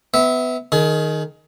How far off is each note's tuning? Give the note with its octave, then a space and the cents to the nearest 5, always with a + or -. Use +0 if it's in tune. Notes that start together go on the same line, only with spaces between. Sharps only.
B3 +20 E5 -20
D#3 +0 G#4 +25